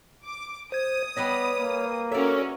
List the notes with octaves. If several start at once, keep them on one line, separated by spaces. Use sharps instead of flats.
D6
C5 D#6 G#6
G3 B3 B4 C#5 D#5
A#3
C#4 F#4 A4 A#4 C#5 D5 E5